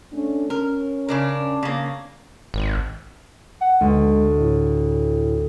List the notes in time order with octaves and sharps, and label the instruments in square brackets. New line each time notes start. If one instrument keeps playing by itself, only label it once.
[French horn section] A3 C#4 D4
[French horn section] C#4 [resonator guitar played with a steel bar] A#4
[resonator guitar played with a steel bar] C#3 D4 A#4
C#3 A#3
[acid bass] G#1
[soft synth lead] F#5
[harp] D2 [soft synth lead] G#3
[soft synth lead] A2